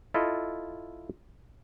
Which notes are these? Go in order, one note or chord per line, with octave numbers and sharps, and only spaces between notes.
E4 F4 A4 D#5